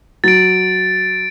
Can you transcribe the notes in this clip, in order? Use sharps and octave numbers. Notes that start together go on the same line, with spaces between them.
F#3 A6 D7